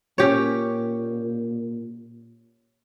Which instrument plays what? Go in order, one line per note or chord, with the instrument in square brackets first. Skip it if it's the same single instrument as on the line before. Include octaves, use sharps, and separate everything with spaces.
[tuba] A#2 [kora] C#4 G4 C#5